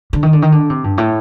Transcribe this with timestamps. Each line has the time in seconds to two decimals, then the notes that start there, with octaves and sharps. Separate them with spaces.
0.13 D3
0.23 D#3
0.33 D3
0.42 D#3
0.52 D3
0.70 C3
0.84 G2
0.98 A2